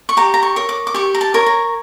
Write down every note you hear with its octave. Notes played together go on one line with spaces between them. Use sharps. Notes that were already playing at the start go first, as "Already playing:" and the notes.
C#6
G4 A#5
A#5
C#6
A#4 C#5
D6
D6
G4 C#6
A#5
A5
A#4 C#5
A#5